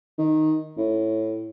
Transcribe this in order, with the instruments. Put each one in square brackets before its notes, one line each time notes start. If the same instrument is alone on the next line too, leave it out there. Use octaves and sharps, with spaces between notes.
[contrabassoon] D#3
A2